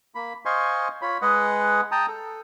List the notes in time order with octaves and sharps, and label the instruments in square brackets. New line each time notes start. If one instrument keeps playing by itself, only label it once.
[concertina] A#3 B5
C5 D#5 F5 G#5 C6 C#6
F4 C#5 B5
G#3 G#4 B4 D#5 F#5
G5 A5 A#5 D#6
A4